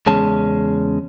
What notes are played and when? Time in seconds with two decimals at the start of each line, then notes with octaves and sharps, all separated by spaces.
0.06 E2 C#3 G#3 C#4 A5